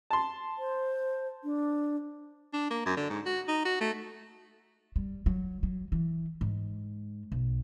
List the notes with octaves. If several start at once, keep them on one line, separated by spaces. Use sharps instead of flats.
A5 C6
C5
D4
D4
A#3
F#2
D3
G#2
F#4
D#4
F#4
A3
G3
F#3
F#3
E3
G#2
B1